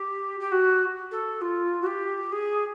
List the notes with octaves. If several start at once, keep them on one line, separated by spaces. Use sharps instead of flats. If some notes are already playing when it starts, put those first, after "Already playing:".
Already playing: G4
G4
F#4
A4
F4
F#4
G4
G#4